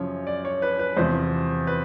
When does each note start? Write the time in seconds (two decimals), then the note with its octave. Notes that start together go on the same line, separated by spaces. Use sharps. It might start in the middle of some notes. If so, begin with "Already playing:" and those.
Already playing: F#2 C#3 F3 C#5
0.27 D5
0.45 C#5
0.62 B4
0.79 B4
0.97 E2 C3 F3 C5
1.67 B4